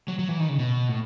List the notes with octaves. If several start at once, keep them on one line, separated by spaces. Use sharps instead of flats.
F#3
F#3
E3
D#3
C#3
B2
A2